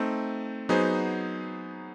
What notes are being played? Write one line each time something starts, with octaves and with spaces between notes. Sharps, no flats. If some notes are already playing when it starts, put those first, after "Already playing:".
Already playing: A3 C4 D#4
F#3 B3 D#4 G#4 C5